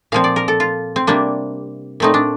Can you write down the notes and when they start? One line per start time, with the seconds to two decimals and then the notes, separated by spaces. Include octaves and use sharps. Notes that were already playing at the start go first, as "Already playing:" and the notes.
0.12 A#2 F3 C4 F5
0.24 D5
0.36 A#4
0.48 A4
0.60 F4
0.96 C4
1.07 C3 G3 A#3 D4
2.00 A#2 A3 C4 D#4
2.14 D4